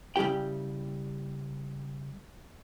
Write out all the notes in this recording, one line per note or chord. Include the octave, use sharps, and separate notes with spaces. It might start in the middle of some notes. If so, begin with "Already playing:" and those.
C#3 G3 E4 G4 G5